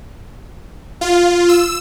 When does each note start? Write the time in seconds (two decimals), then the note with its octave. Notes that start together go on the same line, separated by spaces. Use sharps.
1.01 F4
1.49 E6